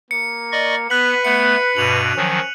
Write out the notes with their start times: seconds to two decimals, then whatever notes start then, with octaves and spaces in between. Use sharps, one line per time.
0.11 A#3 C#7
0.52 D5 D#5 C#6
0.90 B3 B4 F#6 B6 F#7
1.25 A3 B3 C#7
1.77 G2 B2 D#7 F7 F#7
2.17 D#3 F3 F#3 C#4